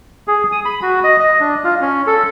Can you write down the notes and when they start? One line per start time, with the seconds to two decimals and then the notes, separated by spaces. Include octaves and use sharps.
0.28 G#4
0.52 D#6
0.65 B5
0.82 F#4
1.04 D#5
1.20 D#5
1.40 D4
1.64 F4
1.81 C#4
2.07 A4